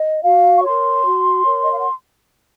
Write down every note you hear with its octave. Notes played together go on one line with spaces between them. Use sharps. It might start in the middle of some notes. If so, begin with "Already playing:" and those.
Already playing: D#5
F#4 F5
C#6
A#4 C#5 C6
F#4
A#4 C#5
D#5
F5
F#5